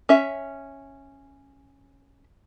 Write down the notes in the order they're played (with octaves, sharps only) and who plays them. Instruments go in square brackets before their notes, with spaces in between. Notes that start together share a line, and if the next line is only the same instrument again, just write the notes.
[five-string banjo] C#4 E5